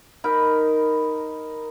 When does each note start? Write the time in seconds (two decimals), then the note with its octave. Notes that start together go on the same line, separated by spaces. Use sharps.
0.24 D#4 A#4 B5